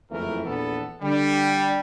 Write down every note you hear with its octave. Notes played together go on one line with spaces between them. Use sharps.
F#1 F2 E3 A3 A#4
A#1 E2 B3 A4
D3 G3